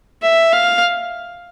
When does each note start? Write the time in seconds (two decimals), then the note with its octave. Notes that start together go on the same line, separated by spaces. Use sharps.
0.22 E5
0.53 F5